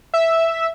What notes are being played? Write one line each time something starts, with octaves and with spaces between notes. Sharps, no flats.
E5